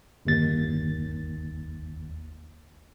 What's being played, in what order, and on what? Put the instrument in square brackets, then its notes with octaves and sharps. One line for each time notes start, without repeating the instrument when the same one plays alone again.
[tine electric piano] G1 D#2 A6